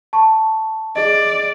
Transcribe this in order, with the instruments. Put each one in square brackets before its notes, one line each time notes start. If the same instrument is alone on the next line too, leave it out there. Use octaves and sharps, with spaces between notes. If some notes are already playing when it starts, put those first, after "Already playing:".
[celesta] A5 C#6
[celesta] G#4 D#5 [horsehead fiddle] D5